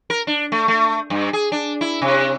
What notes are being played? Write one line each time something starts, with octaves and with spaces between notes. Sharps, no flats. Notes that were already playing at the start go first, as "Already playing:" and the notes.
A#4
D4
A3
A3
G2
G#4
D4
E4
C3